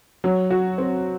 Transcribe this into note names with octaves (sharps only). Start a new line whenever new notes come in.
F#3
F#4
C4